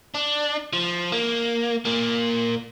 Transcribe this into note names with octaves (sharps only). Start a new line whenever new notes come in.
D4
F3
A#3
A#2 A#3